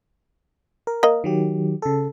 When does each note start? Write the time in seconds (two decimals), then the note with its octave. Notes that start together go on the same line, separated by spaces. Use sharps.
0.87 A#4
1.03 A#3 D#5
1.24 D#3 F#3 G4
1.82 C#3 A4